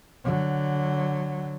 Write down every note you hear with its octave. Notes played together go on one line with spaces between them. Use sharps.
D3 F#3